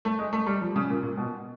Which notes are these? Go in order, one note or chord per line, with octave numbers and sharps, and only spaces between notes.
A3
G#3
A3
G3
F3
C#3
A#2
A#2
B2